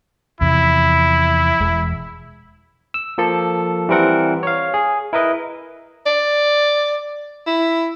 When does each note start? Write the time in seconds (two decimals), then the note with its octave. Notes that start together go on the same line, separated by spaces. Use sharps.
0.41 E2 C3 F3 E4
1.60 E1 G#3
2.94 E6
3.18 F3 A#3 A4
3.89 E3 G3 C4 A#4 F#5
4.43 C#5 F5
4.74 G#4
5.13 E4 A#4 B4 D#5
6.06 D5
7.47 E4